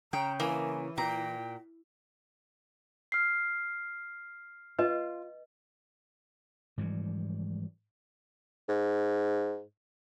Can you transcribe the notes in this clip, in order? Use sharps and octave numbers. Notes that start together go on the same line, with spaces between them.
C#3 G5 A#5
E3 A#3 G#5
A#2 G5 A#5
F6 C7
F4 B4 D#5
G#2 E3 F3 G3
G#2